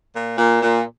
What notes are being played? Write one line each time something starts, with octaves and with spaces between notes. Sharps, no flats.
A#2
A#2
A#2